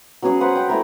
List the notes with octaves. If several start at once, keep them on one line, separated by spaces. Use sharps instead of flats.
F#3 B3 C#4 G#4
B4 C5 F#5
G5
A3 B3 E4 A#4